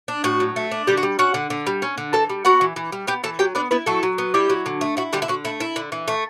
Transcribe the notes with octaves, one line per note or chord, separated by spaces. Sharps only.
D4
A2 F#4
F#3
A3
D4
D3 G3 G4
F#4
G3
C#4 F#4 F#5
D3
D3
G3
C#4
D3
E3 A4 A5
G3
B3 F#4 F#5
E3
E3
G3
B3 G4 G5
E3 A4 A5
F#3 G4 G5
B3 D4 D5
B3 E4 B4
F#3 A3 A4
F#3
B3
G3 E4 G4
F#3
D3
A3
E4 F#4
D3 G3 G4
E4
D3 F#4
A3 E4
E4
D3
E3
A3